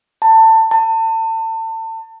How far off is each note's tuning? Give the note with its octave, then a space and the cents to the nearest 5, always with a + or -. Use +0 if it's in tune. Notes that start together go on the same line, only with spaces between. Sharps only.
A5 +25
A5 +35